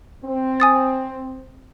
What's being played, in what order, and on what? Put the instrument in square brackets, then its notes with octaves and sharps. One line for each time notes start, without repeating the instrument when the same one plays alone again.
[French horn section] C4
[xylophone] G#5 D#6 A6